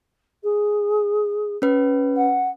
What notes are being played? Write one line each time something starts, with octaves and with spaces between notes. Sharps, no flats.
G#4
C#4 B4
F#5